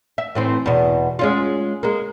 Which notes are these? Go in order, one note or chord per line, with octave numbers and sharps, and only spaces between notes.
E5
A2 E3 C4
E2 B2
G#3 C#4 F4
G#3 A#3